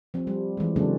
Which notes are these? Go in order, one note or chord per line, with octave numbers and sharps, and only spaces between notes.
F3 C4
G3
E3 G#3
C#3 F#3 G#3 A3 C4 D4